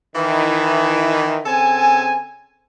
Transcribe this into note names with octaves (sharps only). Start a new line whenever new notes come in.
D#3 E3 E4
C#3 C4 A4 G#5